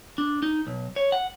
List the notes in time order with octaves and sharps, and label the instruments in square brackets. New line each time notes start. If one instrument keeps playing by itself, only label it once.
[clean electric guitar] D4
D#4
B1
C#5
F#5